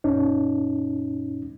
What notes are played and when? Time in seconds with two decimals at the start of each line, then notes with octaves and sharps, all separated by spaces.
0.04 F#2 A#2 C#4 D#4